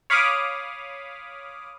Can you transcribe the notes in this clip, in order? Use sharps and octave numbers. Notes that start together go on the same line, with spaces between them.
C#5 F5 B5 D6 D#6 F6